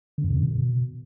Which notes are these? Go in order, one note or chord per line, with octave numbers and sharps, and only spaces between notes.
D3
F#2
C3
D3
B2